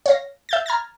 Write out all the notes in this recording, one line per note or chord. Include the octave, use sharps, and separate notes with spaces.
C#5 F5 A#6
E5 G6 A6
A#5 F6 G#6 A6